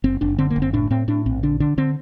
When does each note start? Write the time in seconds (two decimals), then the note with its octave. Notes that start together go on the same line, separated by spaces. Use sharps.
0.04 F#1 C4
0.21 F#1 D4
0.38 D3 C4
0.50 A#3
0.56 F#1
0.62 C4
0.73 A2 D4
0.91 A2 C4
1.08 A2 D4
1.26 A#1 C4
1.43 D3 D4
1.60 D3 D4
1.77 D3 C4